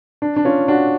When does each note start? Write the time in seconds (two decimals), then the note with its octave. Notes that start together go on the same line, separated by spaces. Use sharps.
0.22 D4
0.36 D4
0.45 C#4 F4
0.68 D4 F#4